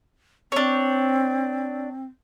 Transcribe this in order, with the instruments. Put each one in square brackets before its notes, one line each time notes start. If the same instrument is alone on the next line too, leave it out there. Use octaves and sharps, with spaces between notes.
[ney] C4 [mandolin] D4 C#5